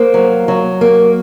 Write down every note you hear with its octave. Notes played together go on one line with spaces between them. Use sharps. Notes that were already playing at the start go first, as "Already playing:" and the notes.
Already playing: A#3 C5
F#3
F#3
A#3